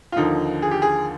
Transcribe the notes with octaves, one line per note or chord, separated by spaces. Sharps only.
F4
D#2 D3 F3 D#4
G#4
G4
G#4